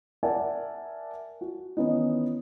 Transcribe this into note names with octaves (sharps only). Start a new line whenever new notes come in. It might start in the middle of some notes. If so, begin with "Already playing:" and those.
A#4 D5 E5 F#5 G#5 A5
F#4
D#3 E3 B3 C#4 D#4